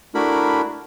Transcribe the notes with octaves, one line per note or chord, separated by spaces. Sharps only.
A3 D4 E4 F#4 A#4 B5